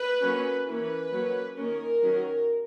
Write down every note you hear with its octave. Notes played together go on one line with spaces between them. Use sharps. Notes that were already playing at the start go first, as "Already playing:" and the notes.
Already playing: B4
F#3 A#3 C#4
E3 A#3 C#4 B4
F#3 A#3 C#4
D#3 A#3 C#4 A#4
D#3 F#3 C#4